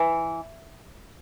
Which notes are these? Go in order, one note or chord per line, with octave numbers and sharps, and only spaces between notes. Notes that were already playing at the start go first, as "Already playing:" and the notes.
Already playing: E3